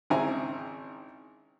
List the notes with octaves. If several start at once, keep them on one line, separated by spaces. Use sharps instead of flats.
G#1 C#3 C4 E4 G#5 A#5